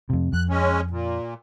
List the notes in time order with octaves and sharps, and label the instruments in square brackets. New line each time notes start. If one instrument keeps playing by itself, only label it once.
[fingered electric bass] F2 C3
[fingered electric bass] F2 [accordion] F#6
[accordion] G#3 C#4
A#2